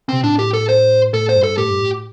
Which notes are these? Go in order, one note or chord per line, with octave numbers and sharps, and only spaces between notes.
C3 C4
A2 D4
G4
A4
C5
A2 A4
C5
G2
A4
A2 G4
G2
A2